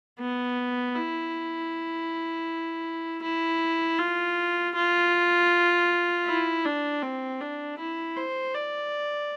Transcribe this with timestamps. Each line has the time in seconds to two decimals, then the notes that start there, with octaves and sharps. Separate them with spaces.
0.19 B3
0.95 E4
3.22 E4
3.98 F4
4.75 F4
6.26 E4
6.65 D4
7.02 C4
7.40 D4
7.78 E4
8.17 C5
8.54 D5